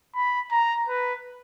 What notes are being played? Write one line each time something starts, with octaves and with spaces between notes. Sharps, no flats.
B5
A#5
B4